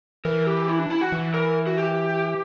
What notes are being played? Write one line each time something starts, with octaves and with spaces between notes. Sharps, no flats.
E3 A#4
G4
E4
D4
E4
F#4
E3
A#4
F#4
G4